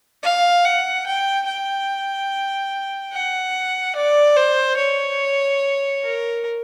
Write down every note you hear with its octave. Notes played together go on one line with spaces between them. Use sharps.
F5
F#5
G5
G5
F#5
D5
C5
C#5
A#4